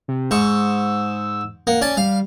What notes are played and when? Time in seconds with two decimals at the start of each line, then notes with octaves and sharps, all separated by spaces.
0.08 C3
0.31 G#2 C#6 E6
1.67 A#3 F#5
1.81 C#4 D5 G#5 A5
1.97 G3 F5